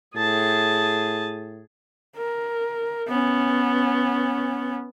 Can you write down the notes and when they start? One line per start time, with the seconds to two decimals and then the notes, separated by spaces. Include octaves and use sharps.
0.16 A2 G#4 A5
2.17 A#4
3.08 B3 C#4